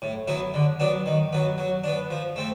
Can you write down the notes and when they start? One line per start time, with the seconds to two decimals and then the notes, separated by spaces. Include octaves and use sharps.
0.02 A2
0.28 F#3 B3 E4
0.54 D3
0.80 F#3 B3 D4
1.06 D#3
1.33 F#3 B3
1.58 F#3
1.84 B3 D4
2.11 F3
2.36 A3 C4